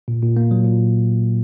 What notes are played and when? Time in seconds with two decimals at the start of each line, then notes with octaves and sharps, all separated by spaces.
0.08 A#2
0.23 A#2
0.37 A#3
0.51 F#3
0.65 A#2